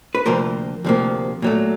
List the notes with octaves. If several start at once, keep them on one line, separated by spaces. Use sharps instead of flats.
B4
D2 C3 F3 A#3 A#4 C5
D2 C3 F3 A#3
A#2 F#3 A3